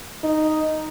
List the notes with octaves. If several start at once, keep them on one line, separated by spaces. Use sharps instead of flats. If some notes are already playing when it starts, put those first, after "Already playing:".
D#4